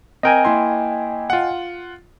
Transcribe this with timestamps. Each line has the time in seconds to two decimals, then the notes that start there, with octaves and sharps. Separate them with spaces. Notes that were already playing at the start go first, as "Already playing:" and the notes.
0.23 C4 A#4 D#5 G5 G#5
0.45 A#3 E4 C6
1.30 F4 F#5